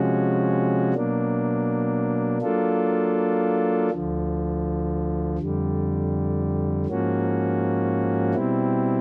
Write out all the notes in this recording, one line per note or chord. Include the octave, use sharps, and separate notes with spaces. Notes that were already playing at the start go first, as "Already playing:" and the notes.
Already playing: C3 F3 G#3 C#4 F#4
B2 F#3 A#3 D4
F#3 A#3 D4 F4 A4
D2 D3 F3
F2 D3 G3
G#2 F3 A#3 C#4 F#4
B2 G3 C4 E4